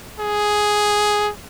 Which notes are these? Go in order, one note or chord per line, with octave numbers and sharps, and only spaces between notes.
G#4